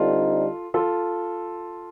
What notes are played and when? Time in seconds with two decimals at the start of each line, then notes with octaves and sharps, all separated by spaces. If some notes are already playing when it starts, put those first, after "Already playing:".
Already playing: D3 G3 C4 D#4 F4 A4
0.74 F4 A4